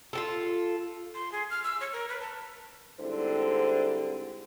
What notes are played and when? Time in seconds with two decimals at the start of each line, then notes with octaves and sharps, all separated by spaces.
0.13 F4 F#4 A4
1.15 C6
1.32 G#4
1.50 F6
1.64 E6
1.81 C#5
1.93 A#4
2.09 B4
2.20 A5
3.00 G#2 D3 G3 C4 E4 C5